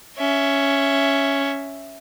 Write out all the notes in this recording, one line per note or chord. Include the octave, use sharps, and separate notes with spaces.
C#4 E5